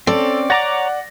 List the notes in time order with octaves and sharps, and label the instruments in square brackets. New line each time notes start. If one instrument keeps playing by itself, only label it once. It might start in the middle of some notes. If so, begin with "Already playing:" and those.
[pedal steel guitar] C4 C#4 [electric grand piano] A4 [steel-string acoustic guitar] D5
[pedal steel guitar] C#5 A#5 D6 [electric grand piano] F#5 A6 A#6